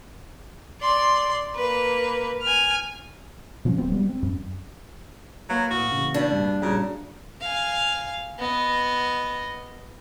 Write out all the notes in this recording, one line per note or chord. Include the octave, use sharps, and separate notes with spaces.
D5 C6
A#3 B4
G#5 F6
B2 F3 F#3 C#4
D1 F#3 B3 C4
G3 G#3 B3
C4
F#2
F#3 A#3 B4 F5
A2 F#4 B4 D#6 F6
C#3 E3
B2 D4
G2
A#1 C#3 G3 C#4 F4 F#4 A#5
F5 G#5
B3 D#5